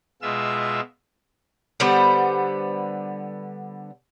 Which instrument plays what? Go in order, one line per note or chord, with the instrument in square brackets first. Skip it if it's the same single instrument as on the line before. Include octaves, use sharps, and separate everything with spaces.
[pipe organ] B2 G#3 F4 E5 E6
[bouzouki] D3 G3 B3 C5